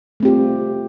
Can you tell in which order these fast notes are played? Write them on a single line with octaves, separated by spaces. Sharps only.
A3 C4 G4 F4